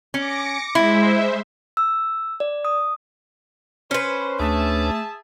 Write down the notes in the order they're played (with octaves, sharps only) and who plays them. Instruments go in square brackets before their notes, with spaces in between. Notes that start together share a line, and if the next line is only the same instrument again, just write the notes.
[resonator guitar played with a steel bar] C#4 [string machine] D6 A#6 C#7
[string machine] G#3 C5 E5 [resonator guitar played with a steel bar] E4
[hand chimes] E6
D5
D#6
[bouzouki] C#4 B4 [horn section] C5
[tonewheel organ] D2 D4 [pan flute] A3 [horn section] G#4 E5 A5